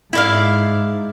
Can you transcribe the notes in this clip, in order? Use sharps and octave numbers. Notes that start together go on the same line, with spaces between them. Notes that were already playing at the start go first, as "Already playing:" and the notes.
G#2 E4 D5 F5